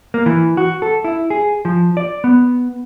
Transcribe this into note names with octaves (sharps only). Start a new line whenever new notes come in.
A#3
E3
F#4
A4
E4
G#4
F3
D5
B3